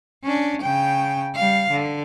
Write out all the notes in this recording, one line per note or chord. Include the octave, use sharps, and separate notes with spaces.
C#4 D4
C#3 G5
G3 F5
D3